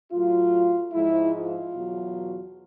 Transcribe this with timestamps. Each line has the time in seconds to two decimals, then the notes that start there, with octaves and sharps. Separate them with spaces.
0.11 A2 F#3 F4
0.93 G#2 F3 G#3 E4
1.34 F4
1.74 E2 B2 F#3